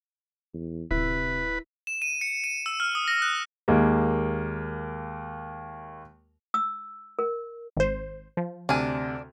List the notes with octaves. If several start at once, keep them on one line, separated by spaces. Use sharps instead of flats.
E2
D1 C3 E4 B4
E7
D#7
C#7
D#7
E6
F6
D#6
A#6
F#6
D#2 G#3 A#3
E6
A#4
G#1 C5
F3
D2 C3 D4 G#5 F6